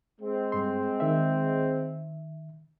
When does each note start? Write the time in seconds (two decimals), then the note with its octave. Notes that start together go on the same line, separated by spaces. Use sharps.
0.21 G#3 C4
0.52 G2 C6
1.00 D#3 E5